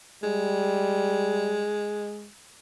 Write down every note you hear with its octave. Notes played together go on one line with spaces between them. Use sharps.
G3 G#3